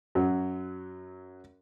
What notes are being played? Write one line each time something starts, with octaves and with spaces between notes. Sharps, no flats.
F#2 F#3